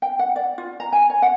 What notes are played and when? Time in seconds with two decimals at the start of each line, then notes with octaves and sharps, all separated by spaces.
0.02 G5
0.19 F#5
0.36 D5
0.58 F4
0.80 A#5
0.92 G#5
1.10 C#5
1.22 F#5